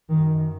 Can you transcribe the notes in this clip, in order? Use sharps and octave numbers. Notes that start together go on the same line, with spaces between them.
F#2 D#3